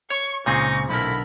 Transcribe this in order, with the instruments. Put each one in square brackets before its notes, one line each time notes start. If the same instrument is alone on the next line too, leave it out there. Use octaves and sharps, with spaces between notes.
[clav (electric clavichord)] C#5 [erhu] C#6
[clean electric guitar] C#2 C#3 G#4 [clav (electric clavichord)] A#2 C4 [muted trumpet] D#4 [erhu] C#6
[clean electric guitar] B1 D3 A#4 [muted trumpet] E4 [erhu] B5